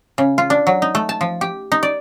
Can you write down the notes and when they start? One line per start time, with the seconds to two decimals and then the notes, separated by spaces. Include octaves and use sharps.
0.18 C#3
0.38 F4
0.50 D4
0.67 F#3
0.82 D#4
0.95 A3
1.09 A5
1.21 F3
1.41 G4
1.72 D#4
1.83 D5